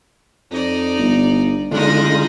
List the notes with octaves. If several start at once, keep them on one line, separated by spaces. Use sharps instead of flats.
F2 D#4 D5
G1
F#1 D3 G#3 D4 D#4 F4